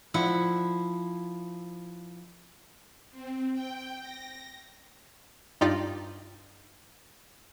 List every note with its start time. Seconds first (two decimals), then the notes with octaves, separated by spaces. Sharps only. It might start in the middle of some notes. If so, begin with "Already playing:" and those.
0.14 F3 E4 F#5
3.11 C4
3.54 G5
4.01 A#6
5.61 G2 D#4 F4 G4 D5